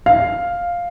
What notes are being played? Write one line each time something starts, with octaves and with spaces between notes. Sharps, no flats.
F5